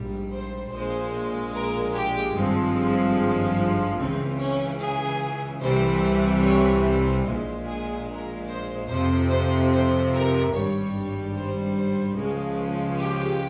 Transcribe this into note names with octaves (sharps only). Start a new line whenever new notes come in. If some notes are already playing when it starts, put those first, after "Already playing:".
Already playing: A#1 G#2 G3
C5
A#1 A#2 G#3 C5
A#4
G4
G#1 G2 F3 G#3 C4
C#2 C#3 E3 C4
C#4
G#4
C2 C3 E3 G3 C5
C#5
C5
A#1 A#2 G#3 C5
G#4
A#4
C5
F2 C3 F3 C5
C5
C5
A#4
G#1 G2 G3 C#5
C5
C5
C#2 C#3 F3 G#3
G4